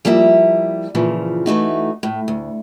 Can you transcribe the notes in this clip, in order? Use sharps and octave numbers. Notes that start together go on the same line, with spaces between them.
F3 G3 A#3 E4 E5
A#2 C#3 E3 F3
E3 A3 D#4 F#4
A2
D2